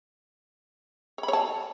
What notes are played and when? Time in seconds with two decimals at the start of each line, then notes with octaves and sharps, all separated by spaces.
1.18 C#5
1.23 B5
1.28 C#5
1.33 A5